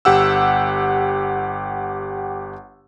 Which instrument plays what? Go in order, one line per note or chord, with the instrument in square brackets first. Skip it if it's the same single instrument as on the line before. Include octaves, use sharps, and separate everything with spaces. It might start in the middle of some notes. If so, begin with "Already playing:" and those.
[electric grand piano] G1 G4 F#5 E6